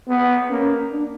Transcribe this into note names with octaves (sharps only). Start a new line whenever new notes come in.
B3
A#3 C#4
D4